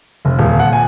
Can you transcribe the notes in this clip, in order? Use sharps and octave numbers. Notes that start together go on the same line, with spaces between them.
F1
D#1
F#5
G#5